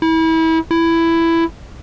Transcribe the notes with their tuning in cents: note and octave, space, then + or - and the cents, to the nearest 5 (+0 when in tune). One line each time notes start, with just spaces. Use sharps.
E4 -30
E4 +10